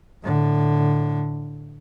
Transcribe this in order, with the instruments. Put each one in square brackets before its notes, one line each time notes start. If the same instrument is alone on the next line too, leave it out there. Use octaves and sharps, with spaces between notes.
[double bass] A2 D3